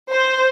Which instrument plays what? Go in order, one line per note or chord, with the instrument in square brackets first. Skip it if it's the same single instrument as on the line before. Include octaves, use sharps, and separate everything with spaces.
[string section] C5